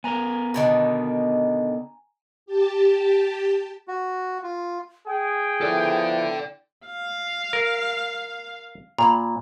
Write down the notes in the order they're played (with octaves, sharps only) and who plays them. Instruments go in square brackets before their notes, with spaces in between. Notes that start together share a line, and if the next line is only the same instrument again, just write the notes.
[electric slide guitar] B3 A#4 [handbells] G#5 A#5
[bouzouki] B2 D3 D#3
[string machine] G4 A5
[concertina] F#4
F4
[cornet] G#4 [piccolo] G5
[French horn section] F3 B3 E4 [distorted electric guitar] A4 D5
[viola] F5
[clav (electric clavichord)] A#4
[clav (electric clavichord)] A#2 [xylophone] A#5 B5